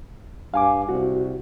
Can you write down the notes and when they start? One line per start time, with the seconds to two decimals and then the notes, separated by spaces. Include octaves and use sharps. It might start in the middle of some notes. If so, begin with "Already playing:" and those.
0.54 G2 F5 G#5 D6
0.89 C2 F#4